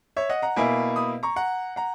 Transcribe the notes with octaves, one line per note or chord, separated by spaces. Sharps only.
C#5 E5
D#5 F#5
F#5 A#5
B2 A#3 E4 G#5 B5
B5 D#6
A#5 C#6
F#5 A#5
F#5 A#5